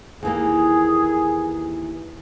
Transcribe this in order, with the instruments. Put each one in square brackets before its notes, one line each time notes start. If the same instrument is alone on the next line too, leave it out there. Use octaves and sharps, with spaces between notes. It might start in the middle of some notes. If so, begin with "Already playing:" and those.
[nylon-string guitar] D#2 E3 A#3 [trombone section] G#4